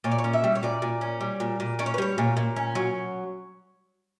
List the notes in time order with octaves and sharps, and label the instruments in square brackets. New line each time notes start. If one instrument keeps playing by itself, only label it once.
[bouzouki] A#2 C#5
D5
C#5
C#4
E5
G3
C#5
A#2 D5
A#2
C#4
G3
A#2
A#2
C#4 D5
C#5
B4
G3 C#5
A#2
A#2
C#4
F#3